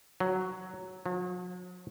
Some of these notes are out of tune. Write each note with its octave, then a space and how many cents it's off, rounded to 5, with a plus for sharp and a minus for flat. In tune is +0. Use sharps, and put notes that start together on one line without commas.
F#3 +5
F#3 -40